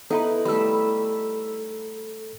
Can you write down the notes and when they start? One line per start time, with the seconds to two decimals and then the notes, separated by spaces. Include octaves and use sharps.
0.11 B3 D#4 E4 A4 B4
0.45 G3 A3 B5 E6